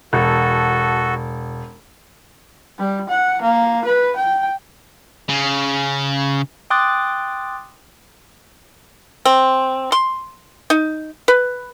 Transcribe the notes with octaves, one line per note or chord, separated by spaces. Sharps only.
E1 F#4 A4
G3
F#5
A#3
B4
G5
C#3
G5 C6 D6 D#6 F#6 A6
C4
C6
D#4
B4